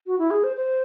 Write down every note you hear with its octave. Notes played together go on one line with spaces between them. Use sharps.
F#4
E4
G#4
C5
C5